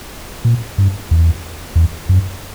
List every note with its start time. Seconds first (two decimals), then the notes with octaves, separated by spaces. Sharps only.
0.45 A#2
0.78 G2
1.11 E2
1.76 E2
2.09 F#2